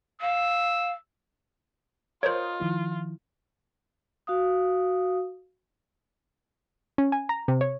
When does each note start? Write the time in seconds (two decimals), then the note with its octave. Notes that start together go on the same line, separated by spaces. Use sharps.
0.21 F5 E6
2.23 F4 A#4 C5 C#5 D#5 D#6
2.60 D#3 F3 E4
4.27 F#4 F5 D#6
6.98 C#4
7.12 G#5
7.29 A#5
7.48 C3
7.61 C#5